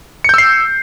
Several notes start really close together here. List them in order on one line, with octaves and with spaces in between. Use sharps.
C#7 G6 E6 C7